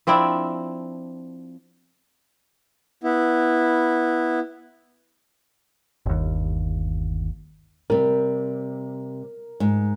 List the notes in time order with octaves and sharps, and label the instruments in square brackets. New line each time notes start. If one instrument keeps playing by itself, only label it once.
[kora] F3 C4 D4 E4
[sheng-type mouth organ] B3 E4
[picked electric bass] G1 D#2
[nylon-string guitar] C3 G3 [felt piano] A#4
[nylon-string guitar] G#2